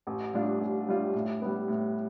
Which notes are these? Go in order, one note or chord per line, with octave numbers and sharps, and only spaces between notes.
A1
A2 G3 D4 F4
A1
A2 G3 D4 F4
A2
G3 B3
A2